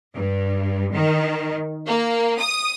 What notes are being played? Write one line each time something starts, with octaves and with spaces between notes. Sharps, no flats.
G2
D#3
A#3
D#6